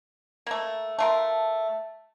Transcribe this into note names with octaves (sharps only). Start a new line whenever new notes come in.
A3 A#3
A3 F4 A#4 E5 A5